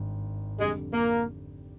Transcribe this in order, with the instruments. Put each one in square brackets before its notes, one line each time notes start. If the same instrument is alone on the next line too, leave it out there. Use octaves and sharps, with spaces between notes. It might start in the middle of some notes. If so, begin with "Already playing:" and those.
Already playing: [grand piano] G#1 G2 D#3
[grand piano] F2 D3 G3 D4 G4 [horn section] G#3
[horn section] A#3